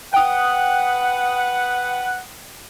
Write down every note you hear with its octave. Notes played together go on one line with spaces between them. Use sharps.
B4 F#5 G5 D#6